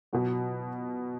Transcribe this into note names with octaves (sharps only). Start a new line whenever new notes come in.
B2 F#3 F#4